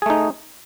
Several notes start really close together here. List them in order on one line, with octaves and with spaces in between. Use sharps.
G#4 A3 D#4